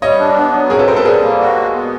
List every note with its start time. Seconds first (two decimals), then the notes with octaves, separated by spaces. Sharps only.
0.01 G3 C#5 D#5
0.19 D4
0.36 B3
0.53 F#3
0.70 C3 G#4 A#4
0.79 A4 B4
0.88 C4 A#4 C5
0.96 A4 B4
1.05 G3 G#4 A#4
1.22 A#3
1.40 F#4
1.56 G#3
1.73 B3